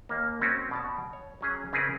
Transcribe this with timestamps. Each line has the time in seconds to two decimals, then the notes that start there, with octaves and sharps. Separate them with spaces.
0.09 D#2 A#3
0.41 C4 C#4 F#4
0.71 B2 D5 A5
1.13 C#5
1.41 F#3 C#4 G#4
1.73 C#3 C4 C#4 G#4 A#4 B4